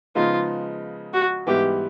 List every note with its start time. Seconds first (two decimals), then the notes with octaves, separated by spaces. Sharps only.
0.15 C#3 F3 G#3 B3 D#4 F4
1.14 F#4
1.47 G#2 E3 G3 B3 E4 G4